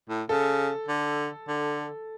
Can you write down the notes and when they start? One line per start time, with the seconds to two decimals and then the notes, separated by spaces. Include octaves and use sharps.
0.10 A2
0.29 C#3 A4
0.88 D3
1.48 D3